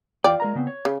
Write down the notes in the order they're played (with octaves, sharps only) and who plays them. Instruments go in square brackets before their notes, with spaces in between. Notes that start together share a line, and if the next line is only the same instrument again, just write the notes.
[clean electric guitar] E2 G5 [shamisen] F4 D5
[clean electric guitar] G#3 A#4 A#5
C#3 B3 C4
C#5
[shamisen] C#3